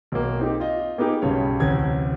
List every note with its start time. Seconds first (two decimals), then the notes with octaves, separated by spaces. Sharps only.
0.12 B1 A#3
0.40 C4 D#4 G4
0.60 F4 D#5
0.98 A#3 B3 D#4 G4 G#4
1.22 B1 G2 C#3 G3 C#5
1.60 A1 D2 C3 G#6